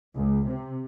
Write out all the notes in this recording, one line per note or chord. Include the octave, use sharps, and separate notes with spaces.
C#2
C3